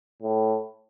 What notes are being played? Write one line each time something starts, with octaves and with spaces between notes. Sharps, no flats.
A2